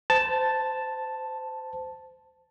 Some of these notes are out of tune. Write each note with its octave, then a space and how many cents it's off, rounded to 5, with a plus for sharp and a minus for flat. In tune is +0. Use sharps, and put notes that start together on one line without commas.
C5 -25 A5 +0